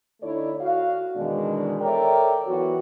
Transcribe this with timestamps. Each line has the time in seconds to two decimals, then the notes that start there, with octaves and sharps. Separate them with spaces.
0.22 D3 A3 D#4 E4 C#5 D5
0.61 F#4 F5
1.16 E2 B2 D#3 G#3 D4
1.81 A4 A#4 C#5 D5 E5 G5
2.47 E3 F#3 B3 F#4